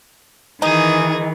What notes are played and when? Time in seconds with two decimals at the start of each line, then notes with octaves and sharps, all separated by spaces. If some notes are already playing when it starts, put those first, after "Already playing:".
0.62 D#3 E3 D#4 G#4